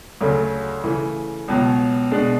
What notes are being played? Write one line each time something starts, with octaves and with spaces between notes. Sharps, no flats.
D2 C#3 F#3 A3
C#3 E3 A3
C#2 B2 F#3
B2 G#3 D4